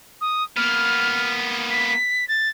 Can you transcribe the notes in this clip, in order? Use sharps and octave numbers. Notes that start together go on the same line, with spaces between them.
D#6
A#3 B3 F6
B6
A6